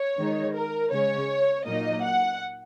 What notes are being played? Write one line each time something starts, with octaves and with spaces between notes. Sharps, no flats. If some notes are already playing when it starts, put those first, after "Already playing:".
Already playing: C#5
D#3 G#3 D#4
A#4
C#3 G#3 C#4 C#5
A#2 F#3 A#3 D#4 D#5
F#5